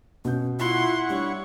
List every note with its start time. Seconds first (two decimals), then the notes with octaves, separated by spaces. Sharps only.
0.25 B2 C#4 G6
0.59 E4 F4 F#5 C6 C#6
1.09 G3 D4 C#5